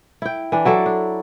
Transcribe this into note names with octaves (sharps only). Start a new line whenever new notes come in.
E4 G5
E3 D4
F#3 E4 A4 D5
D4